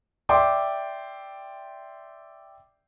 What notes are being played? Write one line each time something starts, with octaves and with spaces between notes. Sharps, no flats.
D5 E5 G5 C6 D6